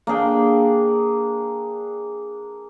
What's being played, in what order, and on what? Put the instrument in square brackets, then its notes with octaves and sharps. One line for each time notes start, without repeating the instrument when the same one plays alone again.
[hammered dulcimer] A#3 D4 G#4 G5